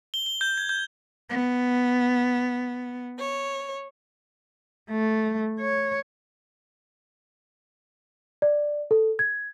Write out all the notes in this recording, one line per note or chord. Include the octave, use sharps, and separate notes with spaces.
G7
G7
G6
G#6
G6
B3
C#5
A3
C#5
D5
A4
G#6